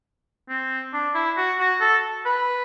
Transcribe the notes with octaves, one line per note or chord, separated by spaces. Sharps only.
C4
D4
E4
F#4
F#4
A4
B4